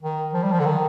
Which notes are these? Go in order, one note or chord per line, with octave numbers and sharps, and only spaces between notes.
D#3
F3
G3
F3
D3
D#3